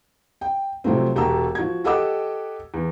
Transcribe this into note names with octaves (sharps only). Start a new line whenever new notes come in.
G5
C3 F3 F#3 A3 C4
E1 F#4 G4 A5 A#5 E6
F3 F#4 G#6
G4 A4 D#5 F#5 D6 E6
E2